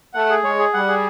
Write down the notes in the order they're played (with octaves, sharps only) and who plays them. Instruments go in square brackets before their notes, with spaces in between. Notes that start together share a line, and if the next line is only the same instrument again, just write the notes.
[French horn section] A3 [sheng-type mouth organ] F#5
[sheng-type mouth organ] G#4
[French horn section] G#3 [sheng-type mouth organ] C#5
[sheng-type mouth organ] G#4
[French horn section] G3 [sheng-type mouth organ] F#5
[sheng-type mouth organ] G#4